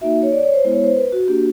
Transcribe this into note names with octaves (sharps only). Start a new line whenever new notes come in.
A#3 D#4 F#4 E5
C#5
D5
C#5
C5
G#3 B3 E4
C#5
C5
B4
F#4
A#3 D4 F#4 G4